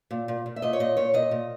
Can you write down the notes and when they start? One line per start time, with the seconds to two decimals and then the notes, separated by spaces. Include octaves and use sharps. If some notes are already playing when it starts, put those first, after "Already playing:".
0.11 A#2
0.28 A#2
0.46 A#2
0.56 E5
0.62 A#2 D#5
0.73 C#5
0.80 A#2 D#5
0.97 A#2 C#5
1.14 A#2 D#5
1.31 A#2